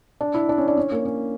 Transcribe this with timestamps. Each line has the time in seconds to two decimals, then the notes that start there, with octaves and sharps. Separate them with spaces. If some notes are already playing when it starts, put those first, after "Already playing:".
0.21 D4
0.34 E4
0.49 D4
0.58 C#4
0.68 D4
0.77 C#4
0.92 A#3
1.05 C#4